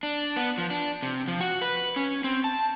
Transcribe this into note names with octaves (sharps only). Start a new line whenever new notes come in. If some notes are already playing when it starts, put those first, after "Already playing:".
D4
B3
F3
D4
C3
F3
F#4
B4
C#4
C4
A5